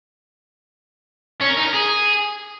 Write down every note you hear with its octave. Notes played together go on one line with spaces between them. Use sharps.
C#4
A#4
D#4
A#4
G#4